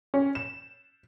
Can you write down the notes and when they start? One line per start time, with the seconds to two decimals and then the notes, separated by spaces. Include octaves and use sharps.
0.14 C#4
0.35 E7